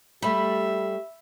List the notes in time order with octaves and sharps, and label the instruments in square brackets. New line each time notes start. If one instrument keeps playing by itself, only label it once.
[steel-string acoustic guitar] G3 A3 [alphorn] G4 [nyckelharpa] E5 [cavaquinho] B5